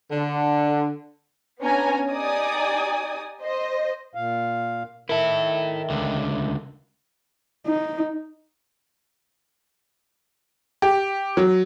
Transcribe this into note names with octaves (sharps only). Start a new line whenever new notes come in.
D3
B3 C#4 D4 G#5 A#5
D#4 G4 D5 G#5 D#6
C5 D#5
A#2 F5
D#3 E4 A4 A#4 E5
C#2 D3
D#4
G4
F#3